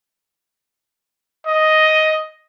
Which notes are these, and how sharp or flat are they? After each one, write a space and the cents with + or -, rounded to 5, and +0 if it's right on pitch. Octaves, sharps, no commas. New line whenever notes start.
D#5 +5